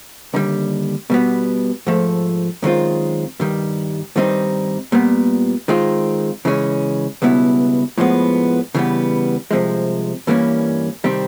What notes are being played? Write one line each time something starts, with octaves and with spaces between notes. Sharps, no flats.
D#2 D3 G3
B2 G3 B3
G#2 F3 A3
F#2 D#3 G#3 C4 F4
G2 D#3 G3
G2 D#3 G3 C4 D#4
A#2 G3 B3
D#3 G#3 C4 F4
C#3 E3 G#3 C#4
C#2 B2 G3 B3 E4
A2 F3 G#3 B3
C#3 E3 G3 B3
C2 C3 F3 G#3
G2 E3 G3 A#3 C#4
C3 D#3 G3 C4